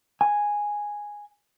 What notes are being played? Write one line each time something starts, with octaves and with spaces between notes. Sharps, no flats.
G#5